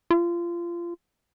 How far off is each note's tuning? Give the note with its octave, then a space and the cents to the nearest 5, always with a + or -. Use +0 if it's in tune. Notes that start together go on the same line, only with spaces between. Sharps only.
F4 -25